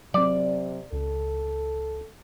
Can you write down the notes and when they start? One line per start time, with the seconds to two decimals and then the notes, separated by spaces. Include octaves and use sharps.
0.14 C3 F#3 C4 D5
0.92 C#2 A4